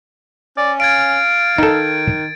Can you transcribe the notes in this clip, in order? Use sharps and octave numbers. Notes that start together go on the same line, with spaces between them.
C#4 D5
F5 G#6 A6 D7
D#3 D#4 A4